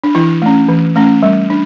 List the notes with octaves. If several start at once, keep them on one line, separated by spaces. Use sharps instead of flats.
D4
E3 E4
A3 C#4
E3
A3 C#4
G3
D4